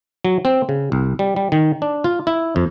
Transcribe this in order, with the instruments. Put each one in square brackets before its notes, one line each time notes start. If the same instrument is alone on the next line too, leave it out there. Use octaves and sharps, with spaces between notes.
[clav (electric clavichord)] F#3
C4
C#3
C2
G3
G3
D#3
D4
F4
E4
F2